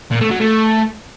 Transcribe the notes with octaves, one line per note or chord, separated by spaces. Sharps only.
A#2
A3
F#3
A3